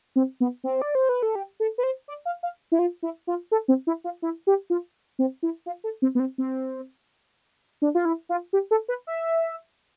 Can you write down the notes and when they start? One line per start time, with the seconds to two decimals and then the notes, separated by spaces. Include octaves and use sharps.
0.16 C4
0.40 B3
0.64 C4
0.82 D5
0.95 C5
1.09 B4
1.23 A4
1.35 G4
1.60 A4
1.78 B4
1.83 C5
2.08 D5
2.25 F5
2.43 F5
2.72 E4
2.79 F4
3.03 E4
3.27 F4
3.52 A4
3.68 C4
3.87 E4
4.04 F4
4.22 E4
4.47 G4
4.70 F4
5.19 C4
5.43 E4
5.66 F4
5.84 A4
6.02 C4
6.15 B3
6.20 C4
6.38 C4
7.82 D4
7.95 F4
8.05 E4
8.29 F4
8.53 G4
8.71 A4
8.88 B4
9.07 E5